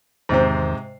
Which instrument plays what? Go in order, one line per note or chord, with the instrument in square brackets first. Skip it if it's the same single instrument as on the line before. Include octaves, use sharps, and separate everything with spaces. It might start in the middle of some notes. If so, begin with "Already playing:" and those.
[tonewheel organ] E2 D#3 [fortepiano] G#2 C3 C5